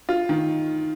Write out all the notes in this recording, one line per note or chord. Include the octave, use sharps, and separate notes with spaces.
F4
D#3